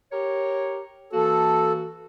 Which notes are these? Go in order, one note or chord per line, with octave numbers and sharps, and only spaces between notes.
G4 A#4 C#5
E3 A#3 F#4 A4